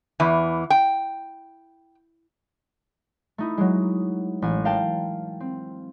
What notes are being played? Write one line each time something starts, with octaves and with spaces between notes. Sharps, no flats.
E2 E3
G5
A3 D#4 E4
F#3 G#3
A1 G#5
A#4 F5 G5 A5
C4